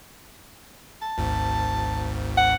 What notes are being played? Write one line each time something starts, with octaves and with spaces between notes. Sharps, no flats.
A5
G#1 D2 G#2
F#5